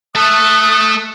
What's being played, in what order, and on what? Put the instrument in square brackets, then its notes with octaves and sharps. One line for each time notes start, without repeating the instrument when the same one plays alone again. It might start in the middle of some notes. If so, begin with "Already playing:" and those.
[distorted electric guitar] A3 A4 [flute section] D#6 F#6